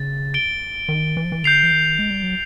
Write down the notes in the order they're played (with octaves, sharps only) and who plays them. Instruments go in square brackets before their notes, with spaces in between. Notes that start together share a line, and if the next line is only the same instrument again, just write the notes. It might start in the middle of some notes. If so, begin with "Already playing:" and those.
Already playing: [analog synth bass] C#3 [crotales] A6
[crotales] A6 D7 G7
[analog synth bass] D#3
E3
F3
E3
[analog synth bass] D3 [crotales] G6 C7 F7
[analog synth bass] E3
D#3
G#3
G3
F#3